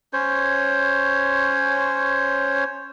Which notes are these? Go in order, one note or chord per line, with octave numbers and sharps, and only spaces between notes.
C#4 C5 C#5